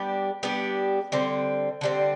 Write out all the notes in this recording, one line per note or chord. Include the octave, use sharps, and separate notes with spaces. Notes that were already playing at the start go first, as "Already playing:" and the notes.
Already playing: G3 B3 D4 G4
G3 B3 D4 G4
D3 G3 C4
D3 G3 C4